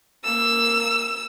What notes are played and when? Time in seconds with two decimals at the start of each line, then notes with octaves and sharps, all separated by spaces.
0.25 A#3 E6